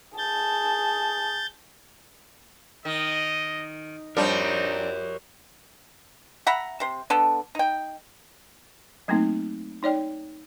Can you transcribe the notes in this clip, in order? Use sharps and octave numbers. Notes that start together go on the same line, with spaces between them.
G#4 A5 G6 A6
D#3 D#5
F3 G3 C4 D4 D#4 A#4 C#5
E5 F#5 A#5 B5
C3 C5
D3 B3 A4
D#4 G5
F#3 A3 A#3 C4 D#4
D#4 C#5 D5 G5